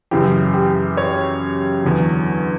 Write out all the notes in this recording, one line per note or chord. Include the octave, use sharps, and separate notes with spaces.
F#2 C#3 E3 G4
G4
C#5
E2 D3 F#3